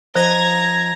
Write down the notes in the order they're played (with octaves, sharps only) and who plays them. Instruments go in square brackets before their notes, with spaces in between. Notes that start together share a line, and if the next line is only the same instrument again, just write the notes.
[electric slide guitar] F3 D#5 [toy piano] C5 [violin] A#5 [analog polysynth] G#6 A#6